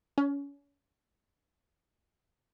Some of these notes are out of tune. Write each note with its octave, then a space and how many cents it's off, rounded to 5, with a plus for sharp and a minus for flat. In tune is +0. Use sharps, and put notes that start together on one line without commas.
C#4 +30